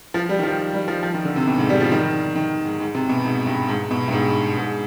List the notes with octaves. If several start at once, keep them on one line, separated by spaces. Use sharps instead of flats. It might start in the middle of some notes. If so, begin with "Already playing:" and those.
F3
G3
D#3
F3
G3
F3
F3
D#3
D3
C3
B2
G#2
G3
F3
D#3
D#3
G#2
G#2
C3
B2
G#2
G2
G#2
B2
G2
G#2
G#2